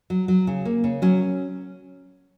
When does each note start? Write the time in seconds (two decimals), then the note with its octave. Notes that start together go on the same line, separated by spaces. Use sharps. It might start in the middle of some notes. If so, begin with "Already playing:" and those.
0.10 F#3
0.28 F#3
0.47 C#3
0.65 A#3
0.84 C#3
1.02 F#3 C#4